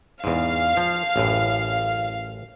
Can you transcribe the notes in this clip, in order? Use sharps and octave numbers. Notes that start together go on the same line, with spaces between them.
E2 G#2 F5
F3
A1 F#2 A2